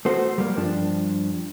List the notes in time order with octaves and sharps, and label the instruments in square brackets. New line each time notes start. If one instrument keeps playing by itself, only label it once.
[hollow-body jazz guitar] A3 B3 F#4 C5
G3 A#3
G2 F3 D4